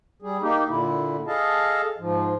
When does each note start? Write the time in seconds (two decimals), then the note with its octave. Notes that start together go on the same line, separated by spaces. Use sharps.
0.22 G3 G#4
0.42 A#3 D#4 G4
0.69 A#2 D3 E4
1.27 G#4 A4 D#5 F5 A5
1.99 G#2 F3